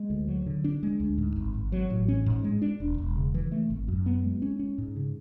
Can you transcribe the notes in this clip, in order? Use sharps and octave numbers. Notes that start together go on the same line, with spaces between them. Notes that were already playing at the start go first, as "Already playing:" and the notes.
Already playing: G#3
D2
F#3
D3
D4
G#3
D2
G#2
G#1
G#1
F#3
A1
C#4
G#2
G#3
D4
E1
E1
C#3
E3
A3
G#1
F#2
B3
G#3
C#4
C#4
G#2
C#3